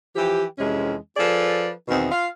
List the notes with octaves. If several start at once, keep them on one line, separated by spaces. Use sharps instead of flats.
E3 F3 G4
F2 C3 E3 G#3 C#4
F3 G#4 A4 B4 D5
E2 B2 D#3 C4 D#4
F4 F5